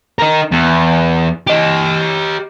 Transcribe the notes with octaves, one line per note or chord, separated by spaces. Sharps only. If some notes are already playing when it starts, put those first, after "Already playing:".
D#4 A#4
E2
G4 D#5